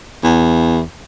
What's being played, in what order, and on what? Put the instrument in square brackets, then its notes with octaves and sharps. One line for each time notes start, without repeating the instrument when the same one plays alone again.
[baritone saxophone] E2